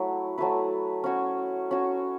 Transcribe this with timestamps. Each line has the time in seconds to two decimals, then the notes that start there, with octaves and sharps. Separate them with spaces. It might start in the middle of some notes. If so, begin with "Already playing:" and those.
Already playing: F#3 A3 E4
0.38 F#3 A3 E4 B4
1.04 C#4 F#4 C#5
1.71 C#4 F#4 C#5